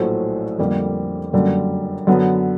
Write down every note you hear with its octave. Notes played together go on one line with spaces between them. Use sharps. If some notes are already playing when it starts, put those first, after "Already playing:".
Already playing: A#1 A2 F#3 A3 C5
F2 D3 G3 A#3
F#1 F#2 D3 G3
F#2 D3 F#3 B3